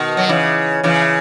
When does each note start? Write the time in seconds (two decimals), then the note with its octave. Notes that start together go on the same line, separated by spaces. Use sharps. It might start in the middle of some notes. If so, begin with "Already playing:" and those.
Already playing: B2 D#3
0.17 F#3
0.29 C#3 E3
0.83 C#3 E3